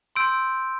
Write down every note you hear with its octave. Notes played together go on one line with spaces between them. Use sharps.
C6 E6 G6 D7